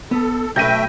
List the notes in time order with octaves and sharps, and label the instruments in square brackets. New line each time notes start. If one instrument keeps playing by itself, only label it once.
[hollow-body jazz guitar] B3 [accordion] A4
[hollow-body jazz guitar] B1 B4 [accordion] A3 E5 G5 [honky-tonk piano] G6 A#6 D#7